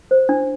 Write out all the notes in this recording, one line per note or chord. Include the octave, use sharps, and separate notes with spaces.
C5
D4